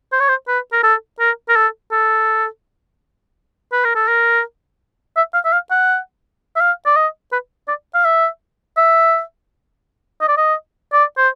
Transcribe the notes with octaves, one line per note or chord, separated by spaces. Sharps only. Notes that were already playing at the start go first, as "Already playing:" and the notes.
C5
C#5
C5
B4
A#4
A4
A#4
A#4
A4
A4
B4
A#4
A4
A#4
E5
F5
E5
F5
F#5
E5
F5
D5
D#5
B4
D5
F5
E5
E5
D#5
D5
D#5
D5
C5